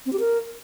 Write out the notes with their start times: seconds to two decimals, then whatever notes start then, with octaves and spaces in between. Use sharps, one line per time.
0.06 C4
0.13 G4
0.20 A#4